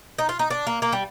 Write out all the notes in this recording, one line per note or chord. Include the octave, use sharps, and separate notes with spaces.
D#4
F4
D#4
D4
A#3
A#3
G3